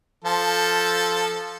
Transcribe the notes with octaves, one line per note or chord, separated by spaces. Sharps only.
F3 A4